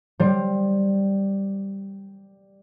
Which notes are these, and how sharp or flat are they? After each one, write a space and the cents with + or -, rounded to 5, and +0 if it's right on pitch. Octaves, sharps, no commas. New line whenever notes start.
G3 +0 C5 +15